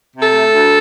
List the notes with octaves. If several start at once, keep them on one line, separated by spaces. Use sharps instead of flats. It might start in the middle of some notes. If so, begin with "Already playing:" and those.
C3
A4
A3
D2